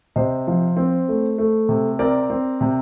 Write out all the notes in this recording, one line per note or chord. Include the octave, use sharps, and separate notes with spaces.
C3 C5 D#5
F3
C4
A3
A3
C3
C4 A#4 D5
C4
C3